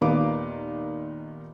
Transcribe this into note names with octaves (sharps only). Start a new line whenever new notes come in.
D#2 A#2 D#3 B3 F5 D6